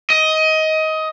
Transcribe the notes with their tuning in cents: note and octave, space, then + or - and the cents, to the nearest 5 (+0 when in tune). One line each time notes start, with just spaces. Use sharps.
D#5 +20